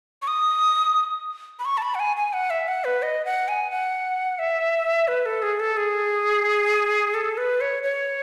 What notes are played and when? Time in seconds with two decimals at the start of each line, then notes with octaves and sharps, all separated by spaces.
0.22 C#6
0.27 D#6
1.59 B5
1.65 C#6
1.77 A5
1.82 B5
1.95 F#5
1.99 G#5
2.17 G#5
2.33 F#5
2.50 E5
2.68 F#5
2.84 B4
3.02 D#5
3.25 F#5
3.48 G#5
3.71 F#5
4.39 E5
5.08 B4
5.26 A4
5.42 G#4
5.60 A4
5.77 G#4
7.14 A4
7.37 B4
7.61 C#5
7.83 C#5